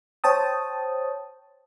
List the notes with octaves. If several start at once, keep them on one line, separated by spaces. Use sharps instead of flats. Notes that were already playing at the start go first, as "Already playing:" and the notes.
C5 C#5 G5 A5 D#6